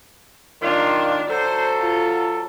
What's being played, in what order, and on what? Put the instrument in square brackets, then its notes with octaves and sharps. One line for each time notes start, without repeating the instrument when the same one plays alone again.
[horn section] D#3 F4 [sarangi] D4
[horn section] F#3 A4 [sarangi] C5
[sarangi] F4